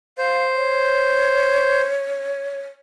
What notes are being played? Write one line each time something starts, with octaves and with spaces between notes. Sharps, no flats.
C5 F5
C#5